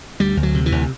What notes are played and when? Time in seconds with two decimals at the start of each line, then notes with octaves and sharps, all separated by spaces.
0.20 D2 G3
0.37 D2
0.43 F#3
0.55 C3
0.66 E3
0.72 D2